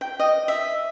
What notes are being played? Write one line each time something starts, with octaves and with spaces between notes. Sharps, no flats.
G5
D#5
E5